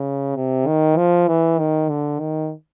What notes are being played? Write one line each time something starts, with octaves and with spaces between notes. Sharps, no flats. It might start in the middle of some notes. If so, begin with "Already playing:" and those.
Already playing: C#3
C3
D#3
F3
E3
D#3
D3
D#3